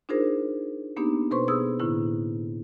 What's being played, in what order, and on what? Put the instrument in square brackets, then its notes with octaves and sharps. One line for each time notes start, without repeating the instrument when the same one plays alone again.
[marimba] D4 D#4 F4 G#4 A#4 C5
A#3 B3 D4 D#4 G4
B2 A4 B4 C5 C6 C#6
B3 G#4 D#6 E6
A2 D3 A#3 E4